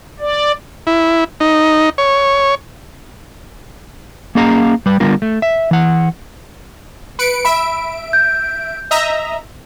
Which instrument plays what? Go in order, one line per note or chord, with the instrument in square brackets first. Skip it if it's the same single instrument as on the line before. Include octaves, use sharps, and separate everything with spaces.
[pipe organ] D5
[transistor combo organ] E4
D#4
C#5
[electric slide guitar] A#3 C#4 G#4 D#5 F5 A#5
G3 B4
D3 G3 B3 F4 A#4
A3
E5
E3 F#5
[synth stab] B4 C#7 D7
[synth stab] E5 D7 [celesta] B5
[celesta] G6
[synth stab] D#5 E5 A#5